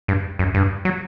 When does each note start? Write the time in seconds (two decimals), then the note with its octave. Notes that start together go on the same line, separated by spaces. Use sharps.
0.08 G2
0.39 F#2
0.54 G2
0.85 F#3